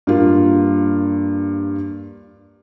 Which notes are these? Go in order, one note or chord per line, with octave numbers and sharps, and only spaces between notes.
G2 A#3 F4